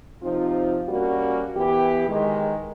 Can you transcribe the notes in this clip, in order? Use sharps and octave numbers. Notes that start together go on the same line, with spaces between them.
C3 F3 C4 D#4 F4
G3 A#3 C#4 F#4
E3 B3 G4
D#3 G#3